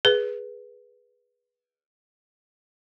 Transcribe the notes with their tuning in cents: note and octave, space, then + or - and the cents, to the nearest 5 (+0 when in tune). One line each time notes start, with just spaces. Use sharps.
G#4 +0 B4 -10